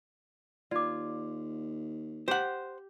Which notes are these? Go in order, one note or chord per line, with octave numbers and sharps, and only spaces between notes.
D#2 F4 D5 D6
G4 C5 F#5